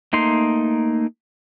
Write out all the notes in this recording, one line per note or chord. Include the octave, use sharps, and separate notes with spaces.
A3 A#3 D#4 C6